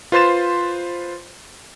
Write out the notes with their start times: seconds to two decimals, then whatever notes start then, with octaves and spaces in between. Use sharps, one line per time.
0.12 F4 B4 C5 C6 A6 E7